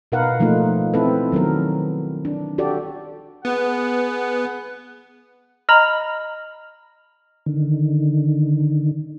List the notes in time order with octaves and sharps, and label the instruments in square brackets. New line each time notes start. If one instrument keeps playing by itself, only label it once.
[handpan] B2 D#4 A#4 B4 F5 F#5
F3 A3 A#3 D#4 F4
C4 E4 A4 B4
D#3 F#3 B3 A#4
D4
F#4 G4 A4 D5
[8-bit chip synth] B3 [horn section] G#4 B4 F#5
[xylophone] D#5 A#5 B5 [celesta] F6
[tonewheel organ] D3 D#3